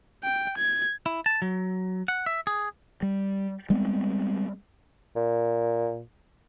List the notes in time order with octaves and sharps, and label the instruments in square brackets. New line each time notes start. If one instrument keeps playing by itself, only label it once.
[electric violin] G5
G#6
[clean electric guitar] E4
A5
F#3
F#5
E5
G#4
[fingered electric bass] G3
G3 G#3 B3 C4
[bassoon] A#2